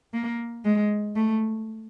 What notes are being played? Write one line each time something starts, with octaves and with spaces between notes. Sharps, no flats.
A#3
G#3
A3